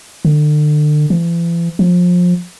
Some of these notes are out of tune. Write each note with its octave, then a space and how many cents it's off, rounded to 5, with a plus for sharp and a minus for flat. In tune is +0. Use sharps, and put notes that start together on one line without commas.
D3 +35
E3 +45
F3 +25